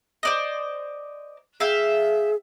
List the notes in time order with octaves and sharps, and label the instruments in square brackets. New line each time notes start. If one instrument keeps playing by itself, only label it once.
[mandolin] C5 D5 D#5
[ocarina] G#4 [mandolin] E5 F5 G5